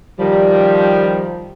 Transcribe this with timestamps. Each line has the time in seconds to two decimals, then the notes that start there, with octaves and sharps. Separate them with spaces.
0.19 D#3 F3 G3